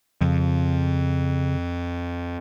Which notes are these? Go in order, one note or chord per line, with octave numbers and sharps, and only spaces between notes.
F2 C#3